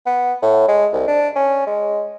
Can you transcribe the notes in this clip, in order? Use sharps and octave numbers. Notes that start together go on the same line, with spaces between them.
B3
A2
G#3
C2
D4
C#4
G#3